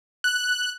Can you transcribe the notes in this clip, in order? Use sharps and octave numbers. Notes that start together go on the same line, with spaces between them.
F#6